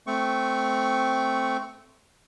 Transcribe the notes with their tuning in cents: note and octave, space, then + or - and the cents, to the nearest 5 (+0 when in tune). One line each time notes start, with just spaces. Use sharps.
A3 +0 C4 -5 C#6 +5